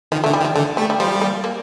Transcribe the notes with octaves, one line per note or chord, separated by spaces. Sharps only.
D#3 F3
D3 A3
G3
D#3
G3
D3 A3
G3 A3
G3
F3 G3
A#3
A#3